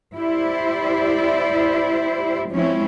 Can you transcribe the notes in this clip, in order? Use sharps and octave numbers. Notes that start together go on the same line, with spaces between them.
E4 G4 C5 D5
F3 G#3 C4 C#4 E4